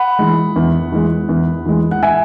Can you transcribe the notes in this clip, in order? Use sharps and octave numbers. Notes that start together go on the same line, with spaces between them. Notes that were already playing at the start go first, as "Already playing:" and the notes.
Already playing: F#5 B5
E3 G#3
E2
E3 G#3
E2
E3 G#3
F#5
E5 G#5